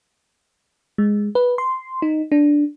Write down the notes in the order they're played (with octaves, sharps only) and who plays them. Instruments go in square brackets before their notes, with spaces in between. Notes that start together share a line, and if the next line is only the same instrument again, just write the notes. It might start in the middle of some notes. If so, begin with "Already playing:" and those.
[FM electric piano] G#3
B4
C6
D#4
D4